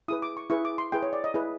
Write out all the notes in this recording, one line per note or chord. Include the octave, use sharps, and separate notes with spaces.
E4 G#4 B4 D#6
D6
C#6
E4 G#4 B4 C#6
D6
C6
E4 G#4 B4 G5
C#5
D5
D#5
E4 G#4 B4